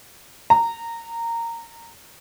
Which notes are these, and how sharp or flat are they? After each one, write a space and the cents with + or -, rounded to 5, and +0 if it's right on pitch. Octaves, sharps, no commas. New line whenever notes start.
A#5 -15